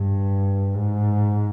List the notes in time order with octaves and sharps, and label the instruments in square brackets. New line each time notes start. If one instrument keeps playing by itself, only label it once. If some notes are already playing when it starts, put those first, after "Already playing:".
Already playing: [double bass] G2
G#2